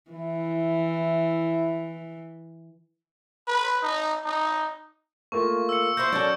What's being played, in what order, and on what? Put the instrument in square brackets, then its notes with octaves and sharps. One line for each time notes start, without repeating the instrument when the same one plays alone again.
[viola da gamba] E3 [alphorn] E4
[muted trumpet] B4
D#4
D#4
[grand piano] A3 A#3 F4 [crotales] C#6
[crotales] E6 C#7
[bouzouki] A#3 E4 C5 [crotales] G6
[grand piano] F#3 C#4 [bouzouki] A4 A#4 D5